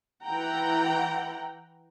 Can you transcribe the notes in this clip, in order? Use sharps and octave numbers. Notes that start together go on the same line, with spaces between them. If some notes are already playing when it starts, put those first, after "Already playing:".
E3 F#5 G5 A#5